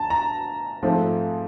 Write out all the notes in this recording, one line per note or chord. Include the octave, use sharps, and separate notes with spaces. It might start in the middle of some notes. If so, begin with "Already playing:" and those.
Already playing: D2 D3 A5 A#5
A#5
G#2 F3 A3 C4